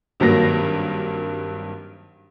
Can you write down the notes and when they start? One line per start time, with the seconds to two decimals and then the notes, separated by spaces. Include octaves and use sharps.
0.20 G#1 G2 F#3 A#3 A#6